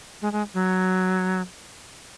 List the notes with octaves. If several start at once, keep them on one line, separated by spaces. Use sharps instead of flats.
G#3
G#3
F#3